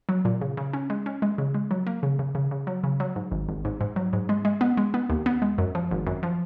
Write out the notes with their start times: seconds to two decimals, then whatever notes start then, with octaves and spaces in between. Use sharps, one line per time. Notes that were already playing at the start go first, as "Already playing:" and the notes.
0.09 F#3
0.25 A#2
0.41 C#3
0.57 C#3
0.73 C#4
0.90 G#3
1.06 C#4
1.22 G#3
1.38 C#3
1.54 G#3
1.71 F#3
1.87 A#3
2.03 C#3
2.19 C#3
2.35 C#3
2.51 C#3
2.67 F#3
2.84 C#3
3.00 F#3
3.16 G#2
3.32 G#1
3.49 G#1
3.65 G#2
3.81 G#2
3.96 F#3
4.13 G#2
4.29 G#3
4.45 G#3
4.61 B3
4.77 G#3
4.94 B3
5.10 D#2
5.26 B3
5.42 G#3
5.58 F#2
5.75 F3
5.91 G#1
6.07 F#2
6.23 F3